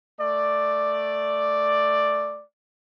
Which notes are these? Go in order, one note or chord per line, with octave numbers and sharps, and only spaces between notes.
A3 D5